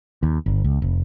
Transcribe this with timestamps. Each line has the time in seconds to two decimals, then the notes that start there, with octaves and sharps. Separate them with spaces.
0.23 D#2
0.46 G1
0.64 C#2
0.82 F1